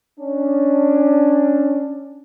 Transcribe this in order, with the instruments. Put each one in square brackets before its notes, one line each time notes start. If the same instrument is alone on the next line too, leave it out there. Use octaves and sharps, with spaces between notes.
[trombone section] C#4 D4